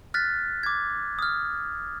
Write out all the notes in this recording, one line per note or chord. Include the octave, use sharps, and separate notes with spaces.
F6 F#6 A6 B6
D6 G#6
D#6 F6